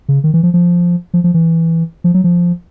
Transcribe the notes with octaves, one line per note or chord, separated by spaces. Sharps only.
C#3
D#3
E3
F3
F3
F3
F3
E3
F3
F#3
F3